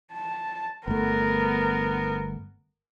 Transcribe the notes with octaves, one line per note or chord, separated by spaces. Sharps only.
A5
G1 A3 B3 A#4